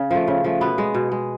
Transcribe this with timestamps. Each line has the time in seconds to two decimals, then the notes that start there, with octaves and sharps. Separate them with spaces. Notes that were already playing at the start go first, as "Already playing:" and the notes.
Already playing: C#3
0.11 F3 A3
0.28 C#3
0.44 F3 A3
0.61 B2 B3
0.78 G#3
0.95 B2
1.12 G#3